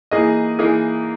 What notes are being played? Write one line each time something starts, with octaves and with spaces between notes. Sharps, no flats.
E3 A#3 D#4 G#4 D#5
E3 A#3 D#4 G#4 D#5